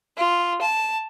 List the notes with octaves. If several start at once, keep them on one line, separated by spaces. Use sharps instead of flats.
F4
A5